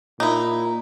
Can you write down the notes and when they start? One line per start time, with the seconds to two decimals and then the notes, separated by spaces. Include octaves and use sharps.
0.20 A#2 D#4 E4